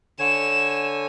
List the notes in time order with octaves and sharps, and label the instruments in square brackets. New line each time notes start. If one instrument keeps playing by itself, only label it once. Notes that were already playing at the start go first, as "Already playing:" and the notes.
[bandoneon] D3 C#5 G#5 [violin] E7